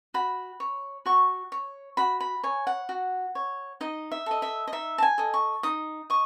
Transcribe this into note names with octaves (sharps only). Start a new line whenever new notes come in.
F#4 B5
C#5
F#4 C#6
C#5
F#4 B5
B5
C#5 G#5
F#5
F#4
C#5
D#4 D#5
E5
A4 D#5
E5
D#5
D#4 E5
A5
G#5
A4 D#5
C#6
D#4 D#6
D#5 C#6